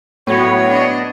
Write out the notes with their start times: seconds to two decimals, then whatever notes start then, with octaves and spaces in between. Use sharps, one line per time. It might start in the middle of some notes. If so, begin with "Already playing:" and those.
0.27 A2 F#3 B3 F#4 C#5
0.68 D4 D#5